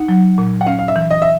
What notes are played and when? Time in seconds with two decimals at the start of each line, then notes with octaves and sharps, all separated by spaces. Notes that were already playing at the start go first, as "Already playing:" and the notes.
Already playing: D#4 F#5
0.08 F#3
0.38 A#2
0.61 F#5
0.66 C#4 F5
0.79 F5
0.88 E5
0.96 E3
1.10 D#5
1.22 E5